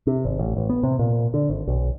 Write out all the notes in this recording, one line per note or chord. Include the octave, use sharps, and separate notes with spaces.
C3
G#1
A1
A1
B3
C3
A#2
D3
G#1
B1